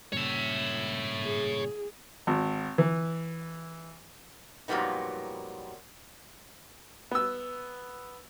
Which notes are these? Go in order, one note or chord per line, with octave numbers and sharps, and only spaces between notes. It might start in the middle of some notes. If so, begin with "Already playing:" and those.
G2 A#2 C#3 C#5 E5
G#4
G#1
E3
F2 A#2 F#3 G3 B3 D#4
B3 E6